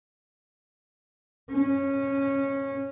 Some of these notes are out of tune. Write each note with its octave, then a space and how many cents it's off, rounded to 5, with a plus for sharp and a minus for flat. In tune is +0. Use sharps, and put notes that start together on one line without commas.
C#4 -15